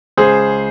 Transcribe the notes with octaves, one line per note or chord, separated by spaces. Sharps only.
C#2 G#4 C5